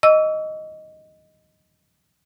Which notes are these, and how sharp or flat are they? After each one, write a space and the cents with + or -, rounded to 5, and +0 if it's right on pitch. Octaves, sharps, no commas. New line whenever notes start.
D#5 +0 C#6 +45 E6 +0